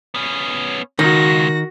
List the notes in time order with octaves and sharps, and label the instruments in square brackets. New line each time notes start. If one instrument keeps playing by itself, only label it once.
[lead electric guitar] B3 C#4
[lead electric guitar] C#2 [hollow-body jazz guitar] D#3 [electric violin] F#4 A#6